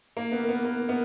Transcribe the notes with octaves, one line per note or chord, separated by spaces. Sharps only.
A#3
B3 A#4
B3 A#4
A#3
B3